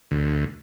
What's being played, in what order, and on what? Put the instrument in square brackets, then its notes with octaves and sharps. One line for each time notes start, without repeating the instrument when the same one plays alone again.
[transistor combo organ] D2